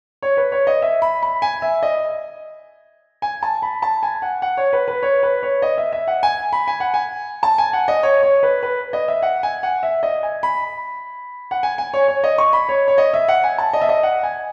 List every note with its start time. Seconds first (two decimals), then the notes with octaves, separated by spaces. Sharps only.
0.23 C#5
0.37 B4
0.52 C#5
0.67 D#5
0.82 E5
1.02 B5
1.23 B5
1.42 G#5
1.62 E5
1.83 D#5
3.22 G#5
3.43 A5
3.62 B5
3.82 A5
4.03 G#5
4.22 F#5
4.42 F#5
4.57 C#5
4.73 B4
4.88 B4
5.03 C#5
5.23 B4
5.43 C#5
5.62 D#5
5.78 E5
5.92 E5
6.07 F#5
6.23 G#5
6.53 B5
6.68 G#5
6.80 F#5
6.94 G#5
7.43 A5
7.58 G#5
7.73 F#5
7.88 D#5
8.03 C#5
8.23 C#5
8.43 B4
8.63 B4
8.93 D#5
9.08 E5
9.22 F#5
9.43 G#5
9.63 F#5
9.83 E5
10.03 D#5
10.23 G#5
10.43 B5
11.51 F#5
11.63 G#5
11.78 G#5
11.94 C#5
12.08 C#5
12.24 D#5
12.38 C#6
12.53 B5
12.69 C#5
12.88 C#5
12.98 D#5
13.14 E5
13.28 F#5
13.44 G#5
13.58 A5
13.73 D#5
13.81 E5
13.89 D#5
14.03 F#5
14.23 G#5